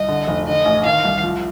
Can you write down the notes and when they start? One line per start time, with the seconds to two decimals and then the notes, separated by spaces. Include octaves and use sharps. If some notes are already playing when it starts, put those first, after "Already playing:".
Already playing: C2 D#5
0.08 D3
0.28 F1
0.47 D3 D#5
0.65 A1
0.85 D#3 F5
1.05 C2
1.23 F3